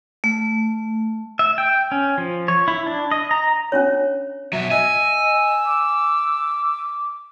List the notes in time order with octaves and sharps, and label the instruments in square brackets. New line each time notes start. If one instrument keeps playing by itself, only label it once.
[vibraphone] A3
[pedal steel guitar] E5
G5
C#4
F3
C#5
E4
D4
D#5
A#5
[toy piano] C#4 D4 C#5
[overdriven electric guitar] B2 F#3 [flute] E5
[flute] D#5 [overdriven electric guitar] G#5 [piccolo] E6
[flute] D6